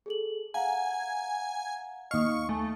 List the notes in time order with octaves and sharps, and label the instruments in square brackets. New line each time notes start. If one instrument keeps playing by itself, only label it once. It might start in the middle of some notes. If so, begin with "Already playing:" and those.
[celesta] G#4 A4 F#7
[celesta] F5 F#5 A#5 [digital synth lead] G#5
[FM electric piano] D#2 F5 [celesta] D#5 D#6 [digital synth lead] C#6
[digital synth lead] A3 [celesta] G#5